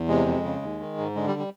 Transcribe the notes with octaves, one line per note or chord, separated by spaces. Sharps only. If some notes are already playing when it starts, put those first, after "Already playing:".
Already playing: E2
C3 G#3
F2
C#3
D#2
D#3
G#2
D3 G#3
G3
G3